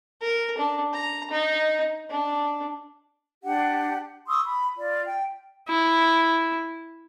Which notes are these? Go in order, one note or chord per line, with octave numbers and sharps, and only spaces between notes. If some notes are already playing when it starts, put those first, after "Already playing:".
A#4
D4
A#5
D#4
D4
D4 G4 F#5
C6 C#6 D#6 E6
B5
F4 D5
G5
E4